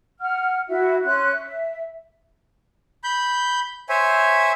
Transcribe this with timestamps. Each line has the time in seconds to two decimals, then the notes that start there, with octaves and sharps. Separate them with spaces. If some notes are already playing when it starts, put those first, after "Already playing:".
0.20 F#5 F6
0.69 E4 F#4 E5
1.05 C#4 C6 F#6
1.31 E5
3.04 B5 G6
3.89 C5 C#5 E5 G#5